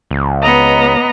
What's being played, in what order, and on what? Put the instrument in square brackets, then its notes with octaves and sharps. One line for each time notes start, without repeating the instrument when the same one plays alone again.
[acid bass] C#2
[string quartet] B3 D#5 A#5